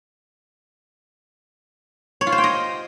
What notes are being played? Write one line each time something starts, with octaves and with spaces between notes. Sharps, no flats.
C#5
F4
C5
G5
D#5